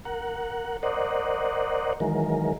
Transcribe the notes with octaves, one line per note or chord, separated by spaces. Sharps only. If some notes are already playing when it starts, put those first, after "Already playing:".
A#4 F#5
A#4 C5 D5 D#5 F#5
D#3 E3 F#3 G#3 A#4